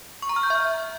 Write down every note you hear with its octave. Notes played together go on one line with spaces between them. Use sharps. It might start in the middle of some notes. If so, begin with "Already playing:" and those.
C#6
A#5
F6
G6
E5